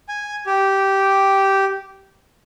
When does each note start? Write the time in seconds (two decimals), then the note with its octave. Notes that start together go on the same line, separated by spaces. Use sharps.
0.09 G#5
0.46 G4